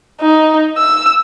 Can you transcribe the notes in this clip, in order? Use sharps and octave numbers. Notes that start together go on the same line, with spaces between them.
D#4
E6